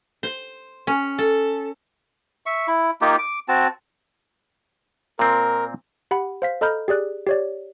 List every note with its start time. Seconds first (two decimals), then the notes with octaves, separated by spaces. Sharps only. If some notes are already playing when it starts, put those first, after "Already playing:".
0.23 C5
0.87 C#4
1.18 A4
2.46 E5 C#6
2.68 E4
3.01 A#3 D#4 F4 G4
3.18 D6
3.48 C4 F#4 A5
5.19 A#2 C4 A#4
6.11 G4 F#5 B5
6.42 C5 F5 B6
6.61 A4 D#5 A#5 B5 F6 G6
6.88 G4 G#4 D5 F#6
7.27 G4 C#5 D5